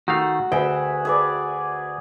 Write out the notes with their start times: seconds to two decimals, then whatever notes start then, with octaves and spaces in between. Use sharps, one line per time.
0.08 D#3 A3 F#4 F5
0.52 D2 G#4 B4 E5 G5
1.05 G#4 B4 D5